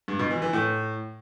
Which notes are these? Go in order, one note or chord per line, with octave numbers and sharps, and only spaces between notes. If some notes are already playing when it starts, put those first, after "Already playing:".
G2
B2
E3
E3
A2